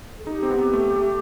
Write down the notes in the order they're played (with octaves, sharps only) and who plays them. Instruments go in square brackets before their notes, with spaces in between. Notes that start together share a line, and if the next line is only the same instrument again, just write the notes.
[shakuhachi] A4
[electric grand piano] D#4 [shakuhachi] G4
[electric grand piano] C4
B3
A3
A3